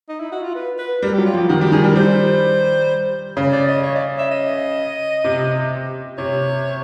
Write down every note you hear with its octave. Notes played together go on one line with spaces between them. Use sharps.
D#4
E4
F#4
F4
B4
B4
G3 A#4
G4
F#3
F4
F3
G4
D#3 F#4
G3 G4
D#3 G#4
G3 A#4
G3 C5
C#3
D5
D#5
C#5
D5
E5
D#5
C3
C3 C#5